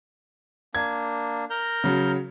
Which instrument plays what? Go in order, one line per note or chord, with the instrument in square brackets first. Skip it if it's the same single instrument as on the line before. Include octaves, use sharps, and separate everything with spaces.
[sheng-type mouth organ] A#3 D4 [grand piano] G#6
[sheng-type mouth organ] A#4 A#5 G6
[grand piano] C#3 F#3